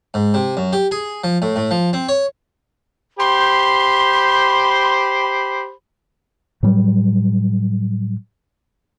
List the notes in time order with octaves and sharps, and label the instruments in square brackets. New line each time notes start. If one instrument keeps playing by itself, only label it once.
[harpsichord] G#2
C3
F#2
G4
G#4
F3
A2
A2
F3
C4
C#5
[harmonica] G4 C5 B5 [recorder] C6
[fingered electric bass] A2 F#3 G3